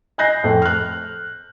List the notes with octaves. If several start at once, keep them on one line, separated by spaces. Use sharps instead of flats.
D#5 G#5 F#6 G6 A#6 C7
F2 A2 A4
F6 F#6